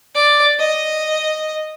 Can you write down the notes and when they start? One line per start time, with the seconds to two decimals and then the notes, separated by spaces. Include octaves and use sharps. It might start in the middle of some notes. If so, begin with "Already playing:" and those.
0.15 D5
0.59 D#5